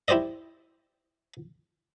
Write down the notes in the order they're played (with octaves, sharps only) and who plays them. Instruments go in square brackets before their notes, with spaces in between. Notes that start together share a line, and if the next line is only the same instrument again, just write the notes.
[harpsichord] E4 G4 C5 D5 D#5